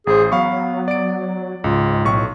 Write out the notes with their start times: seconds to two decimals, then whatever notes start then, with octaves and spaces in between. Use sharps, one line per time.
0.07 A1 G#4 C5
0.32 F#3 B3 F5 B5 C#6
0.88 D5 D7
1.64 C#2 G#2 F4
2.05 B1 A2 C#6